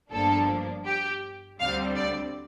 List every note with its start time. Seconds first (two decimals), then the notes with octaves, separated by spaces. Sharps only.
0.11 G1 G2 F3 A#3 D4 A4
0.86 G4
1.60 D2 D3 G3 C4 F5
1.96 D5